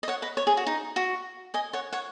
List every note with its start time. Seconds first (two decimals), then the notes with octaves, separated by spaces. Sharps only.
0.03 D#5
0.08 C#5 F#5
0.22 B4 D#5
0.37 C#5
0.47 G#4
0.57 F#4
0.67 D#4
0.96 F#4
1.54 D#5 G#5
1.73 C#5 F#5
1.93 C#5 F#5